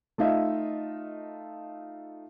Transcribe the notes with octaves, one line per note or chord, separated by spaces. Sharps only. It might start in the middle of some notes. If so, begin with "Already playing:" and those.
A3 D#4 F4 D#5 E5